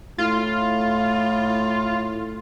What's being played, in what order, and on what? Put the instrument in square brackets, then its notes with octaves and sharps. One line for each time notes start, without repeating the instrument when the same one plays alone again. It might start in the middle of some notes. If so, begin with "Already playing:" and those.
[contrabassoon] A2 [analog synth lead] F4